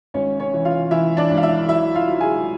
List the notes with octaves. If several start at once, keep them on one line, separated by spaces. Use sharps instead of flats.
G#1 C#4 C#5
C#4 C#5
E3
F4 F5
E3 E4 E5
D4 D5
G#1
F5
E4 E5
F#3 E4 E5
F4 F5
F#3
G#4 G#5